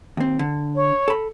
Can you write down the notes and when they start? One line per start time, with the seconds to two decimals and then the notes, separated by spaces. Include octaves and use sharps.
0.17 D#2 C4
0.39 D3
0.75 C#5
1.08 A4 B5